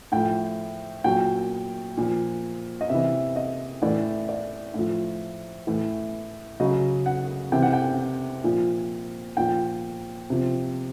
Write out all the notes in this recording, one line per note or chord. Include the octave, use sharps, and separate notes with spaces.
A2 F3 G5
A#2 F#3 G5
A#2 F3
D#5
C3 E3 E5
D#5
A2 E3 D5
D5
A2 F3
A2 E3
C#3 F#3 D#5
F#5
C3 E3 G5
F#5
G5
A#2 F3
A#2 F3 G5
C3 F3